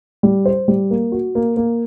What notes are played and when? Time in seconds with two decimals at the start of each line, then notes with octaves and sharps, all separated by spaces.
0.23 G3
0.46 C5
0.68 G3
0.91 A#3
1.12 F#4
1.35 A#3
1.57 A#3